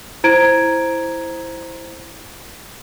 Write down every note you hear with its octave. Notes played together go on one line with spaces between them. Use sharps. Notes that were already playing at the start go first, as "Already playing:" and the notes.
E4 C5 A#5 G#6 D7